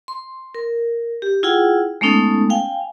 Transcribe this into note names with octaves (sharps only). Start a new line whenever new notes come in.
C6
A#4
G4
E4 F4 G#4 F#5 G5
G#3 A3 B3 C#4 D#4 A4
F5 G5 G#5